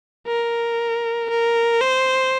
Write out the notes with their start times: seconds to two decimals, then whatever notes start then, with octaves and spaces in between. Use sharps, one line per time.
0.27 A#4
1.30 A#4
1.81 C5